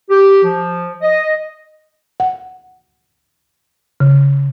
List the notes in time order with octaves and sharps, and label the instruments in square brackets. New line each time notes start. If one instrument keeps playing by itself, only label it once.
[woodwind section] G4
F3
D#5
[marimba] F#5
C#3